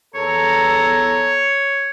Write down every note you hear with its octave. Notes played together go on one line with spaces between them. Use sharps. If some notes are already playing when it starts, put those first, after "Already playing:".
E2 A4 C#5 A#5